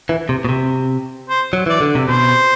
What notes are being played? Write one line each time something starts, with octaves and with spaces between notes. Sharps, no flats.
E3
C3
B2
C3
C5
F#3
E3 D5
D3
C3
B2 C5